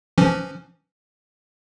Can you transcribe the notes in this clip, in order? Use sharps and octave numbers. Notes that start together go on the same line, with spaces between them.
E3 F3 C#4